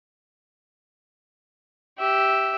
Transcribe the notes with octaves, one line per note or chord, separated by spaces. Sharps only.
G4 E5